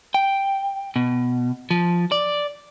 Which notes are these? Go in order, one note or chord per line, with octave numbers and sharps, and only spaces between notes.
G5
B2
F3
D5